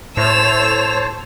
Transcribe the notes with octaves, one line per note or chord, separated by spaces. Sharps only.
A2 C5 C#5 A5 E6 F7